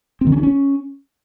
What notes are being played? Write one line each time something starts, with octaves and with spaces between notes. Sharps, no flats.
C4
D#3
C#4
D4
C#4